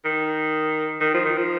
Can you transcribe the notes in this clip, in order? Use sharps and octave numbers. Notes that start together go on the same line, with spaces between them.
D#3
D#3
F3
D#3
F3